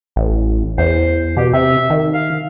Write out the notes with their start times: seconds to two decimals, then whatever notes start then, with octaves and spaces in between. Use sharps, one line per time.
0.16 A1
0.78 E2 C5
1.37 B2 G4
1.54 C3 E5
1.90 D#3
2.14 F5